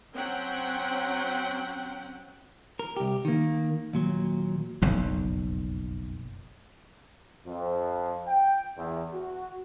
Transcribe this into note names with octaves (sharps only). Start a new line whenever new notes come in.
F#3 C4 C#4 F#5 G5
A#4
C2 G4
D#3 A#3
D#2 A#2 F#3
F#1 B1 F2
F2
G5
E2
F#4